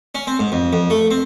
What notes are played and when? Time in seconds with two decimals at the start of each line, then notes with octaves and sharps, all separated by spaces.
0.15 C#4
0.27 C4
0.39 G#2
0.52 F2
0.73 F2
0.90 A3
1.11 C4